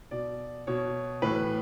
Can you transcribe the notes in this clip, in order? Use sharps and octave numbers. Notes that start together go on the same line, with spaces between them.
B2 D5
B2 C#5
A2 E3 B4